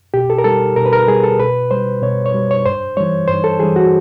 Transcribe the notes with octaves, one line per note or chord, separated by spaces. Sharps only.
B2 G4
A4
A#4
G3 A4
B2 A#4
B4
A#4
G3 G#4
A4
B2 B4
G3 C5
B2 C#5
C#5
G3
C#5
G2 C5
E3 G3 C#5
G2 C5
A4
E3 G3 G#4
F#4